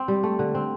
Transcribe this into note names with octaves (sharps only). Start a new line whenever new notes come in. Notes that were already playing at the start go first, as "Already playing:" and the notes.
Already playing: C4
G3
A3
D3
C4